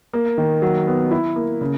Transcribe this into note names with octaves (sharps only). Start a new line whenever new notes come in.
A#3
D#3
F#3
B3
E4
A#3
C#3